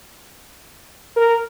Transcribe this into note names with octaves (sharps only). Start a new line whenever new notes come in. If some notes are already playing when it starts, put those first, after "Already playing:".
A#4